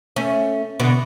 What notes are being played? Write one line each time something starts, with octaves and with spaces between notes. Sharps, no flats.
A3 C#4
B2 D3